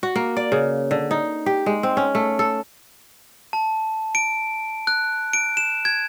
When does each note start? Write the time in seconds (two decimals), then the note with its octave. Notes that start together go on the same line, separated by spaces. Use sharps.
0.03 F#4
0.16 A#3
0.37 D5
0.52 C#3
0.91 D3
1.11 D#4
1.46 G4
1.66 G#3
1.83 C4
1.97 C#4
2.15 A3
2.39 A4
3.53 A5
4.15 D7
4.87 F#6
5.33 D7
5.57 E7
5.85 G#6